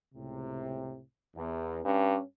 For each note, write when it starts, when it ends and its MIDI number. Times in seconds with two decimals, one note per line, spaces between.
0.14 1.01 37
0.14 1.01 45
0.14 1.01 48
1.37 1.83 40
1.85 2.17 43
1.85 2.21 61